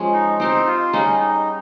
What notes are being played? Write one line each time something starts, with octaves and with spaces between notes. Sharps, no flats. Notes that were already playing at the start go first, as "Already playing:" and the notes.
Already playing: F3 G#3 C#4
D#4
C4 D#4 G4 C5
F4
G3 C#4 D#4 G#4 D#5
D#4